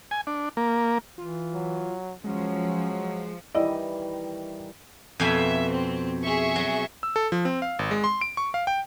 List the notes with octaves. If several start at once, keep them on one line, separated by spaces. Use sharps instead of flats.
G#5
D4
A#3
E3 F4
F#3
F3 F#3 G#3 C#4
D#3 E3 G3 E4 D5 D#5
F2 B2 E5 G#5
C4
G#4 E5 C#6
F#3
E6
A4
F3
C4
F5
G#1
G#3
C6
D7
C#6
F5
G5